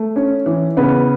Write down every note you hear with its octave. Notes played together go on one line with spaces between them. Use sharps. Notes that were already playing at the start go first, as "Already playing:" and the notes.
Already playing: A3
C#4
E3
C#3 B3 B4